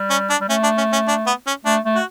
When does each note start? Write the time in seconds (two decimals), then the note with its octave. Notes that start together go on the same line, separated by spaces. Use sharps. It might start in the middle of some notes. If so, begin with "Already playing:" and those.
Already playing: G3
0.10 C#4
0.30 D4
0.40 G3
0.48 A3 C#4
0.63 D4
0.78 C#4
0.93 C#4
1.08 D4
1.27 B3
1.47 C#4
1.65 A3 D4
1.85 A3
1.95 F#4